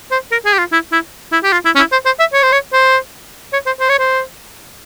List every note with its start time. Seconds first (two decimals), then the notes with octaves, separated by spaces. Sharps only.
0.11 C5
0.32 A#4
0.45 G#4
0.53 G4
0.58 F4
0.72 E4
0.92 E4
1.32 E4
1.43 G4
1.52 F4
1.65 E4
1.75 C#4
1.79 E4
1.92 C5
2.06 C5
2.19 E5
2.33 C#5
2.43 C5
2.52 C#5
2.73 C5
3.53 C#5
3.66 C5
3.80 C5
3.89 C#5
3.99 C5